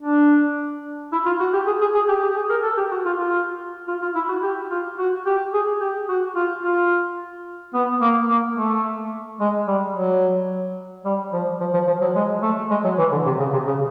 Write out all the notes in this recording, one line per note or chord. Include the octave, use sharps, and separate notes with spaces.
D4
E4
F4
F#4
G4
G#4
G#4
G#4
G4
G4
G#4
A#4
A4
G4
F#4
F4
F4
F4
F4
E4
F#4
G4
F4
F#4
G4
G#4
G4
F#4
F4
F4
B3
A#3
A#3
A3
G#3
G3
F#3
G3
F3
F3
F3
F3
F#3
G#3
A3
G#3
F#3
E3
D3
C3
C#3
C3
C#3